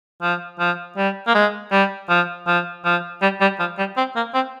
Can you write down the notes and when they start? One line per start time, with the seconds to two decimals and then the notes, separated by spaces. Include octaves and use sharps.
0.22 F3
0.59 F3
0.97 G3
1.27 A#3
1.35 G#3
1.72 G3
2.09 F3
2.47 F3
2.85 F3
3.22 G3
3.41 G3
3.60 F3
3.78 G3
3.97 C4
4.16 A#3
4.34 C4